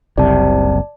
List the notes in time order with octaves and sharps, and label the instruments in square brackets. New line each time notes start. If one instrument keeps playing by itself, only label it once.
[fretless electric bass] F#1 C2 C3 [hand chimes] D5 A5